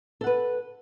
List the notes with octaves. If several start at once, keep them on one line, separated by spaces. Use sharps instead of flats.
A4 B4 F#5